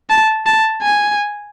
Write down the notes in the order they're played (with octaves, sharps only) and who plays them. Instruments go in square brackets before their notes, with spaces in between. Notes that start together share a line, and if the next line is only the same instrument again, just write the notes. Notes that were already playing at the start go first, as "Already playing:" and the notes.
[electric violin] A5
A5
G#5